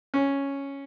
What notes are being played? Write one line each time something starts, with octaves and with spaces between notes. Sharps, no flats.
C#4